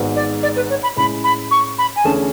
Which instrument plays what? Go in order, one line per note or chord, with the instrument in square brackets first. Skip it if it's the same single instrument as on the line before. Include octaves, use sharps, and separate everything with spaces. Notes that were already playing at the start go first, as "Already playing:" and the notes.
Already playing: [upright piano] G#1 G#2 G#3 B3
[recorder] D5
D5
B4
C#5
B5
[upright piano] A2 G#3 C#4 E4 G#4 [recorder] B5
[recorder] B5
C#6
B5
G#5
[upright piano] E2 D3 A3 C#4 G#4 [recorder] A5